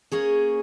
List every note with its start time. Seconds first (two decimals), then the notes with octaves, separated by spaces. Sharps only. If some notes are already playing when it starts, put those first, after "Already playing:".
0.12 A#3 C#4 G#4 C#5